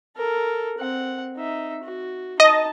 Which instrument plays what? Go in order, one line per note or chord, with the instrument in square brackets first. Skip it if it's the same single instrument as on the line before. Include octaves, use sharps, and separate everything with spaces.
[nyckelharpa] A4 A#4
C4 F#5
D#4 E5
F#4
[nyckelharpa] D#4 A5 [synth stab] D#5